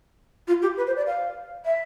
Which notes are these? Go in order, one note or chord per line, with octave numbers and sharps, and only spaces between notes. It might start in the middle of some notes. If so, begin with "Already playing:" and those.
F4
G4
B4
C5
D5
F5
E5